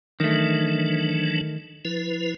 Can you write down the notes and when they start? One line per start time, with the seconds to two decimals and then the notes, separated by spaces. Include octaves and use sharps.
0.20 D#3 E3 F#3 A3 D4
1.85 F3 E4 B4